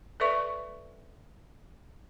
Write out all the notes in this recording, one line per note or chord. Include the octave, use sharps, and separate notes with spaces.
A4 B4 D5 E5 C#6